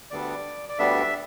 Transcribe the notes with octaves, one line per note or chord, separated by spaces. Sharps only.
D2 D3 G3 B3 D4 D5
D5
D2 D3 G3 B3 D4 E5